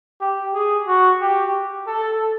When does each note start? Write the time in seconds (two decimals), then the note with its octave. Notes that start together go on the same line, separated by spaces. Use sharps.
0.21 G4
0.54 G#4
0.87 F#4
1.21 G4
1.87 A4